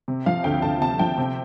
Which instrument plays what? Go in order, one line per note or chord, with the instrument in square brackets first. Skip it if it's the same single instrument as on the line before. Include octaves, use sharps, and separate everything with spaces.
[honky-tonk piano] C3
F3 F5
D2 G5
D2 A5
C3 A5
F3 G5
C3